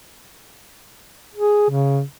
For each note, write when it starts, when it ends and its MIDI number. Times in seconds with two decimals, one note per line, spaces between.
1.35 1.68 68
1.70 2.02 49